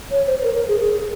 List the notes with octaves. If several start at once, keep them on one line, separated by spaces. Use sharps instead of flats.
C#5
C5
C5
A#4
A#4
G#4
G#4